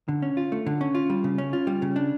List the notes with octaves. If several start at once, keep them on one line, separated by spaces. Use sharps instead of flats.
D3
C#4
F4
A3
D3
C#4
F4
G3
C#3
C#4
F4
G3
C#3
D4